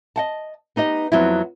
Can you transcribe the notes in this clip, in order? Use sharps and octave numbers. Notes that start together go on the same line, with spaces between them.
D#5 F#5 A5
B3 D#4 G4 D#5
F2 F#3 B3 C4 E4